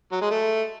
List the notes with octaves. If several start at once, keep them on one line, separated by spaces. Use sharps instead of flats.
F#3
G#3
A3